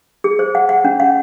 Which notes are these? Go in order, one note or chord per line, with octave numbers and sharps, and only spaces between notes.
G#4
C5
F#5
F#5
C#4
F#5